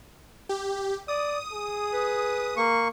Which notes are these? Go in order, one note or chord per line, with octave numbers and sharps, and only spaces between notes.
G4
D5 D#6
G#4
B4
A#3 C#6